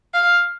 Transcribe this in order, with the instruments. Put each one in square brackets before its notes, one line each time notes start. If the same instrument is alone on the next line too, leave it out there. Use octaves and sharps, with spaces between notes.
[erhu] F5